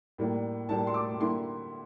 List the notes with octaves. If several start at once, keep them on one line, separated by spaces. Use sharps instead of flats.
A2 G3 A#3 D4
A2 G3 A#3 D4 A5
C6
D6
D3 G3 A#3 E4 C6